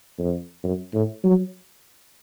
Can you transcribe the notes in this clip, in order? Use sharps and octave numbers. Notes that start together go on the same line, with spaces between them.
F2
F#2
A2
F#3